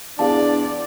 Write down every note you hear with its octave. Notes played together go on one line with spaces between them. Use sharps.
E2 D4 G#4 D5 F5 A5